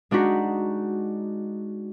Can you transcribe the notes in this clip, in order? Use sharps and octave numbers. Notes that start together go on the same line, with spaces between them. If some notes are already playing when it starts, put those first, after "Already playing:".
G#3 D4 D#4 F#4 B6